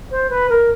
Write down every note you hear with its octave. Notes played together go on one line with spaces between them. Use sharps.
C5
B4
A#4